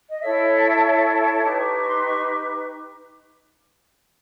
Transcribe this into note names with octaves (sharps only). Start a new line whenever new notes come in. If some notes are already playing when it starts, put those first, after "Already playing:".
D#5
E4 A4 C#5 E5
D#4 G4 B4 A5
C#6
C#6
C6
C#6